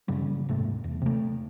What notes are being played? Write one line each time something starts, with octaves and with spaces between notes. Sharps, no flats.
A1 F#2 C#3 G3
D#1 G#2 C3 A3
E2
C3 A3